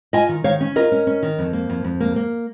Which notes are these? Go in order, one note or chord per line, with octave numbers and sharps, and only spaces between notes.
F4 D#5 G#5
D#3
D#3 C#5 F5
C#4
F4 A#4 D#5
C#4
C#4
D#3
F2
A#3
F2
F2
A#3
A#3